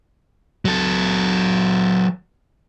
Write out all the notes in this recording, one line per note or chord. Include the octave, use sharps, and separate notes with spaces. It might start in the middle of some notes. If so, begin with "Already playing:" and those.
F#3 A4